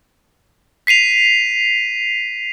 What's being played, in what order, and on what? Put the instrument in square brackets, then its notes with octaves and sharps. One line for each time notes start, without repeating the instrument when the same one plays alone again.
[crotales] B6 C7 D#7 F7